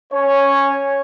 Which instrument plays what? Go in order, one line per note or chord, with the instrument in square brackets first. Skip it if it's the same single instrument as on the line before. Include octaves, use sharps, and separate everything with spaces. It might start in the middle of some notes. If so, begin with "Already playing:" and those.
[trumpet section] C#4 C#5